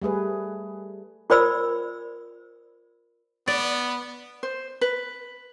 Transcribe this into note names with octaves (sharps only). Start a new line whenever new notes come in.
G3 A3 G#4 B4
F4 A#4 C5 D5 B5 E6
B3 D5
C5
B4